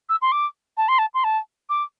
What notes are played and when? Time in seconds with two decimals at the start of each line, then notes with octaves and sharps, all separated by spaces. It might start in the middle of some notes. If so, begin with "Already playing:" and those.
0.09 E6
0.22 C6
0.32 D6
0.77 A5
0.88 C6
0.99 A5
1.14 C6
1.24 A5
1.69 D6